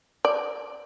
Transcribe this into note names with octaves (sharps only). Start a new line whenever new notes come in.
D5